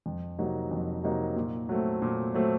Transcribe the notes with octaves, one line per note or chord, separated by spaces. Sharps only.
F2
C3 F#3 A#3 D#4
F2
C3 F#3 A#3 D#4
A#2
F#3 A3 C4
A#2
F#3 A3 C4